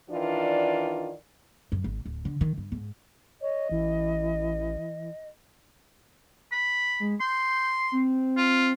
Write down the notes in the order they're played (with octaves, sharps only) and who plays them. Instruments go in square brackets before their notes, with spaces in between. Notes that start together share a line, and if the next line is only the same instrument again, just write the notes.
[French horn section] D#3 E3 D4 F4 D5
[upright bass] F#2
G#1
D1
D3
D#3
G2
G#2
[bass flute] C#5 [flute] D#5
[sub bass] A1 [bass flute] E3
[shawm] B5
[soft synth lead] G#3
[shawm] C6 [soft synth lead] G6
[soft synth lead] C4
[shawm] F4